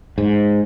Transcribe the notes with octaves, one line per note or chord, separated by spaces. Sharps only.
G#2